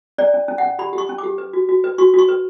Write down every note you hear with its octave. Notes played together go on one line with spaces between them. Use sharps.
C#4 D5
C#4
C#4
C#4 F#5
G4 B5
G4
C#6
C#4
D6
G4
B4
F#4
F#4
B4
F#4 C#6
F#4 C#6
B4